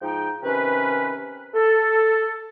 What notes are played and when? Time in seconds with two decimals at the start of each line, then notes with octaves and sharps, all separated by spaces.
0.02 G#2 F3 D#4 G5
0.43 C3 D#3 C#4 B4
1.54 A4